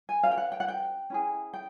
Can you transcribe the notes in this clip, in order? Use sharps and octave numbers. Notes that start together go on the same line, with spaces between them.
G#5
C#4 F#4 B4 F5
G5
F#5
G5
F#5
G5
C#4 E4 G#4
G5